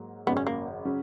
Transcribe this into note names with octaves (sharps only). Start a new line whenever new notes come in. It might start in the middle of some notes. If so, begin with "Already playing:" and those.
Already playing: G#2 F#3 A#3
G#1 F#2 C#3 F#3 B3
C#4
A#3
C#3 F#3 C#4